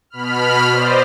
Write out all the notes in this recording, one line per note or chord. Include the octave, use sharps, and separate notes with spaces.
B2 B5 F6
C5 D5 D#5